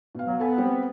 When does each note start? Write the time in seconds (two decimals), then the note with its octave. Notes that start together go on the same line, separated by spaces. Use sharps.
0.15 B2 F5
0.26 F#3
0.40 B3 A4 G#5
0.58 G3 C4